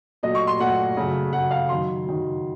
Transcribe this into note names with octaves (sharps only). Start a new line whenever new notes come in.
A#2 F#3 A3 D#5
C#6
C6
A#2 F#3 A3 F#5
F#2 C#3 A3
F#2 C#3 A3 F#5
F5
F#2 D#3 F#3 C6
F#2 D#3 F#3